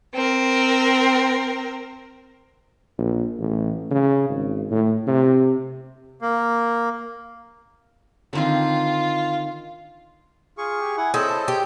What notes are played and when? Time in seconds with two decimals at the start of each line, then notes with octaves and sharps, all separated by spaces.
0.13 C4 A#4
2.98 A#1
3.39 A1
3.91 C#3
4.30 G#1
4.71 A2
5.07 C3
6.22 A#3
8.33 D3 D#3 C4 F4
10.58 F4 G#4 C#6
10.81 G4
10.97 E4 F#5 G#5
11.14 C4 E4 G#4 A4 C5 C#5 D#5
11.29 A5
11.48 G4